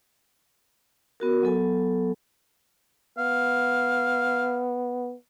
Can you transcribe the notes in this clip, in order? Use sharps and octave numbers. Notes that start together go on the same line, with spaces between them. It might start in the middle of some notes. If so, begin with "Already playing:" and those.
B3 F#4 A#4
F#3 B3 A4 G#5
B3 F5